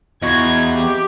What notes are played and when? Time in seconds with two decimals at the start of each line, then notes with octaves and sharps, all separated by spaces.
0.22 E2 D#4 F4 F#4 G#6
0.74 G4